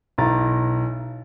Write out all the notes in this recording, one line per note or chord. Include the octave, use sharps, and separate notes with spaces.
B1 E4 A#5 A6